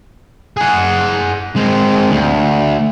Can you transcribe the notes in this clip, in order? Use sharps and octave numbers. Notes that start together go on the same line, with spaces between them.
G#4 F#5
G#3 C4
D2